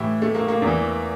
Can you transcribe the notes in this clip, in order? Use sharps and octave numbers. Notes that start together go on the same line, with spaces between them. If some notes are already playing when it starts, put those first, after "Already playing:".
Already playing: A2 E3 E4 G4
A3
A#3
A#3
E2
E3